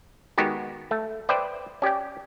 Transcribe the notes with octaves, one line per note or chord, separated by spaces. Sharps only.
D#3 G#3 B3 D#4 F#4 G4
A3
B4 C5 D5 E5 G5
C#4 G4 D5 G5